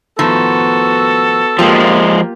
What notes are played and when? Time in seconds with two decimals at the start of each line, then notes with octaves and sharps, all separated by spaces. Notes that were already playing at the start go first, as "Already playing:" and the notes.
0.19 A2 D#3 F3 B3 F#4 A4
1.59 F3 G#3 A#3 F4 G4